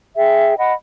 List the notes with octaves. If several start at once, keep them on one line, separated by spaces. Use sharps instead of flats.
G#4 E5 G5
D#5 F#5 B5